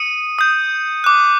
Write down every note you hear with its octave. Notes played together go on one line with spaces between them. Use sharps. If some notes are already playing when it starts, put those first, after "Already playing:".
Already playing: D#6 C#7 D#7
D#6 G6
D6 F#6